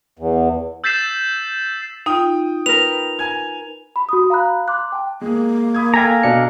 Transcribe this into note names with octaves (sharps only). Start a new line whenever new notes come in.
E2
E6 G6 A6 B6 C7 E7
D#4 F4 G5 D#6
A#4 B4 F7
G#5 G#6
B5
F#4 D#6
F5 A#5 B5 F#6
C6 D6 F#6
G5 A5
G#3 A#3 G#4
B5 D#6 G#6
A4 F5 G5 G#5 A#5 B6
B2 D4 C#7